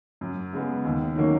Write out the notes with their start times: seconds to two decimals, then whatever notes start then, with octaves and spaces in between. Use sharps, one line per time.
0.21 F#2
0.53 C#3 G#3 B3
0.85 D#2
1.16 D#3 F#3 A#3 C#4